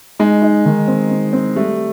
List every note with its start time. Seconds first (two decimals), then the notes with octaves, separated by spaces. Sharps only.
0.19 G#3 D#4
0.42 D#4
0.65 D#3
0.88 C4
1.11 C4
1.33 C4
1.56 G3 A3